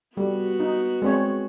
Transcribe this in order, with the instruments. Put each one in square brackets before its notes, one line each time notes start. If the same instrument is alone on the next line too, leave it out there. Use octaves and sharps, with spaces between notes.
[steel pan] G3 [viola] B3 F#4
[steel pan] D#4
G#3 C4 C#5